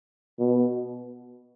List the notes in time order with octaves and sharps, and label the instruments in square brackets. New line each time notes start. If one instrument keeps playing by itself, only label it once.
[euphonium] B2